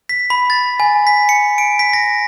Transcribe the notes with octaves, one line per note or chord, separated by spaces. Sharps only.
B6
B5
A6
G#5
B6
C#7
D7
B6
A#6